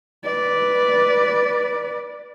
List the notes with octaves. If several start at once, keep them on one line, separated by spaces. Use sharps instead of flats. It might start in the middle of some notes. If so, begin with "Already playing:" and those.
B4 D5